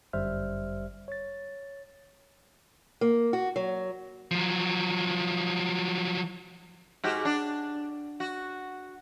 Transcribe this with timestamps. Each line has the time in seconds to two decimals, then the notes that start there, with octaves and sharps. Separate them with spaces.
0.13 G1 F#2 G3 C5 E5 F6
1.08 C#5 A6
3.01 A#3
3.33 F#4
3.56 F#3
4.31 F3 F#3
7.04 G#2 F#4 G4
7.25 D4
8.20 F#4